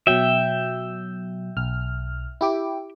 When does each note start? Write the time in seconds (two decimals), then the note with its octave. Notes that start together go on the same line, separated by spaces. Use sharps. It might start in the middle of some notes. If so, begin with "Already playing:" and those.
0.07 B2 F#3 E5 G5
1.57 B1 F6
2.41 E4 G4 D6